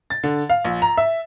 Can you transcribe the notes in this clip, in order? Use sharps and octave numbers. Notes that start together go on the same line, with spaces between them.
A6
D3
F5
A#1
A#5
E5